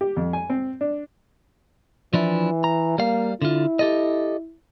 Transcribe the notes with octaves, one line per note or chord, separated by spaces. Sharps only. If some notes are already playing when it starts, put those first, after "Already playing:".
G4
F2
G#5
C4
D4
E3 F3 D4 E4
A#5
G3 A#3 F5
D3 E4 F4
G4 A4 D#5